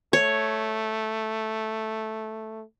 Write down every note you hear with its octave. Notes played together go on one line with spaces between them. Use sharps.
A3 C#5